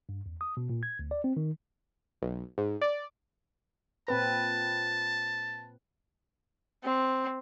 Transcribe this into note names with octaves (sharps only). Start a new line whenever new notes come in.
G2
E2
D#6
B2
A#2
G#6
D2
D5
C4
D#3
B1
G#2
D5
A#2 C4 B4 A5
C4